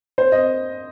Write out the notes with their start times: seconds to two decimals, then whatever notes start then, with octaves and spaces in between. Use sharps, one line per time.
0.18 C5
0.32 D#5